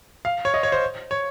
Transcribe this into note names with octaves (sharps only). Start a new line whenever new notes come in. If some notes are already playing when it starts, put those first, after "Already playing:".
F5
C#5
D#5
C#5
C5
C#5